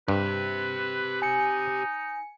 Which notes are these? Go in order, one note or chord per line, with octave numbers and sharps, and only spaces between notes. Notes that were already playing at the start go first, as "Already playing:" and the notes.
G2 G4 B4 C5
D#4 G#5 C#7